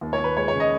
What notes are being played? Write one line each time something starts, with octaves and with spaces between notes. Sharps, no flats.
D#2
C#5
D#2
B4
G#3 C#5
C#5
C#3
D#5